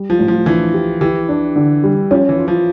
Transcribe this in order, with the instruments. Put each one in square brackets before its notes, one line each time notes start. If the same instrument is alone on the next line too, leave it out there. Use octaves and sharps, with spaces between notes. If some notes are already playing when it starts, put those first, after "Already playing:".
Already playing: [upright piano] G3
[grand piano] F3
[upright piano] A2
[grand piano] F3
[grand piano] E3 [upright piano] D4
[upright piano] G4
[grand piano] E3 [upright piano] G4
[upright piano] D4
D3
G3
[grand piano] F3 [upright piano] C#4
[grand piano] E3
[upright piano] F4
[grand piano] F3